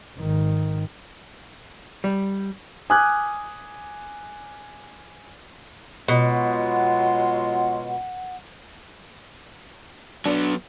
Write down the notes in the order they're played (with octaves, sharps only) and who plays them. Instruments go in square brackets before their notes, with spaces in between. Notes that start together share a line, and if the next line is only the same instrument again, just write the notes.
[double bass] G#1 D#3
[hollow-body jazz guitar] G3
[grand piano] G#5 D6 D#6 F6 F#6 G#6
[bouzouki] B2 [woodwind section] F#3 G#3 F4 [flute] F#5
[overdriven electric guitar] F#3 B3 [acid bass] D4